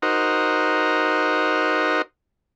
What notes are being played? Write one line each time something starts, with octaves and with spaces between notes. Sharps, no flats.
D#4 F#4 A#4 C5